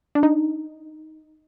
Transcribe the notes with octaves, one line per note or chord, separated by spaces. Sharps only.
D4
D#4